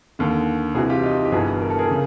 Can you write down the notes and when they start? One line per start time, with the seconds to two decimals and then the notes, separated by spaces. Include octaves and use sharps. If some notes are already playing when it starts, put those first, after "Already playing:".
0.19 D#2 D3
0.75 C2 C3 E3 F#4 G#4
0.89 F4 G4
1.03 D#4 F4
1.25 G4
1.31 G1 G2 E3 F#4 G#4
1.61 A#4
1.70 A4
1.79 G#4 A#4
1.91 C#3